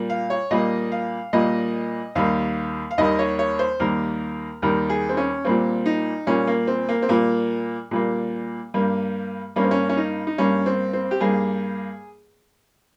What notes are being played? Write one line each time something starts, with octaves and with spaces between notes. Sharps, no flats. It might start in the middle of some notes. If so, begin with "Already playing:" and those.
Already playing: A#2 G3 A#3
F5
C#5
A#2 G3 A#3 D#5
F5
A#2 G3 A#3 D#5
D#2 D#3 G3 A#3 F5
F5
D#2 D#3 G3 A#3 D#5
C#5
C#5
C5
D#2 D#3 G3 A#3 A#4
D#2 D#3 G3 A#3 A#4
G#4
C4
C#4
A#2 G3 A#3 C4
D#4
A#2 G3 A#3 C#4
A#3
C4
A#3
C4
A#2 G3 A#3
A#2 G3 A#3
G2 G3 A#3
G2 G3 A#3 C#4
C4
C#4
C#4
D#4
D#4
G2 G3 A#3 C#4
C4
C4
G4
G2 G3 A#3 G#4